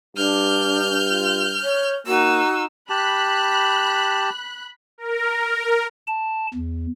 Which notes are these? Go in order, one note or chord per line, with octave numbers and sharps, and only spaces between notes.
G2 D4 F6 G6
F4
C#5
A#3 D#4 F#4 E6
G4 A5 B5 F#6
A#4
A5
E2